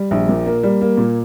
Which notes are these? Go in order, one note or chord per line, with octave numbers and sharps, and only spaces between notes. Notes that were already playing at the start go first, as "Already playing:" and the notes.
Already playing: G3
A#1
A#2
A#3
G3
A#3
A#2